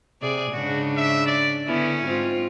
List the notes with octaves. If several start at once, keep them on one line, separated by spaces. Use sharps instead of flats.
C3 G#4 D5
G#2 C#3 D4 F#4
E5
D5
D3 B3 C#4 E4
G#2 C4 F4